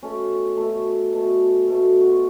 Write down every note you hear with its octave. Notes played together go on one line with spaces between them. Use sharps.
B2 A3 C#4
B2 A3
B2 A3
B2 A3
F#4
F4